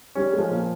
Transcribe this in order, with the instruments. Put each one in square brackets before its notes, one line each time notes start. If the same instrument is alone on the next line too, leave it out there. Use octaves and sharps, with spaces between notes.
[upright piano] G3 [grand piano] C#4
[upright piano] G#3
[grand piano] F3
[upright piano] A#2